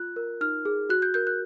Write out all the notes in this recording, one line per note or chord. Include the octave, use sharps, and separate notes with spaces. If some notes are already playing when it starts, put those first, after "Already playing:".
Already playing: F4 F#6
A#4
D#4 F6
G#4
F#4 F#6
G6
A#4 G6
F#6